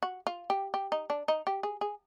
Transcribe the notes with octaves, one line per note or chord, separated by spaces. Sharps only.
F#4
F4
G4
G4
D#4
D4
D#4
G4
G#4
G#4